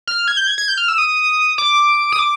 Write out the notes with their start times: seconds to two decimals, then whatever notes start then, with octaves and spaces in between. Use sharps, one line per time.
0.07 F6
0.28 G#6
0.37 G6
0.47 G#6
0.58 G#6
0.68 G6
0.78 F6
0.88 E6
0.98 D#6
1.58 D6
2.12 D#6
2.19 D6